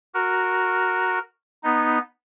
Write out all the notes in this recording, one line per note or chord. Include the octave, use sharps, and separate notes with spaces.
F#4 A#4
B3 D#4